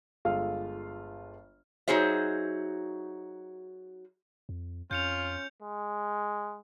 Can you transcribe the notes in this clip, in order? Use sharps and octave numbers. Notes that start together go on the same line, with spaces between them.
G1 G#3 F4 A4 F5 F6
F#3 D#4 F#4 G#4 C5 E5
F2
F2 C#4 F4 G6 C#7 F7
G#3